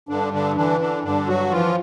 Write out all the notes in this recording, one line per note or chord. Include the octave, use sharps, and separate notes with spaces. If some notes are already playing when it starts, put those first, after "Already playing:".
G2 D3 D4
D3 D4
D3 E3 D4
D3 D4
G2 D3 D4
F#3 F#4
E3 F3 F4